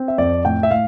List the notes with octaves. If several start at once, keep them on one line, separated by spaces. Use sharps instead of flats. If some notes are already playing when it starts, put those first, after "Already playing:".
Already playing: C4
E5
F2 D5
A2 G5
E5
A2 F5